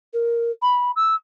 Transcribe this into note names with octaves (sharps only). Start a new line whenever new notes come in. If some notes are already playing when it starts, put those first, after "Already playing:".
A#4
B5
E6